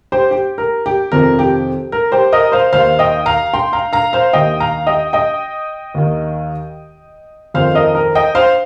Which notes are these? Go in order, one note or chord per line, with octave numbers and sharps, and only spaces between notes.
G4 C5
G4
A#4
G4
F2 C3 D#3 A#4
G4
A#4
G4 C5
A#4 D#5
C5 F5
D#2 D#3 C5 F5
D#5 G5
F5 A#5
G5 C6
F5 A#5
F5 A#5
C5 F5
D#2 D#3 D#5 G5
F5 A#5
D#5 G5
D#5 G5
D#2 D#3
F2 D#3 C5 F5
A#4 D#5
A#4
D#5 G5
C5 F5